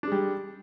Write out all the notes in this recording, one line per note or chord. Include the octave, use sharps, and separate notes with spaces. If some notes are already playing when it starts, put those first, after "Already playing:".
G3 G#3 D4